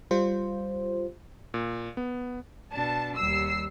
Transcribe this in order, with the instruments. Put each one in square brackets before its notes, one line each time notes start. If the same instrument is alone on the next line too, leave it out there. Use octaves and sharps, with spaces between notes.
[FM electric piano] G3 F4 C5
[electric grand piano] A#2
B3
[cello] B2 D4 [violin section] A5
[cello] D#2 G3 [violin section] E6 C7